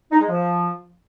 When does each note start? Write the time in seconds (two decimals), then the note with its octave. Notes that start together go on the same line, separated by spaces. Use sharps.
0.10 D#4
0.20 G#3
0.29 F3